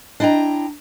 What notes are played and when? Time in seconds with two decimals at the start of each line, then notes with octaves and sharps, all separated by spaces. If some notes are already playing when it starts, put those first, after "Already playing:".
0.20 D4 E4 D#5 G5 A#5